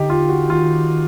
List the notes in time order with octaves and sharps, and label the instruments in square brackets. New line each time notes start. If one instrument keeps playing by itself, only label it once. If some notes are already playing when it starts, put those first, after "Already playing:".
Already playing: [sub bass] D3 [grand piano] D#4 G4
[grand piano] F4
F#4
[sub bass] D#3 [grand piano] F4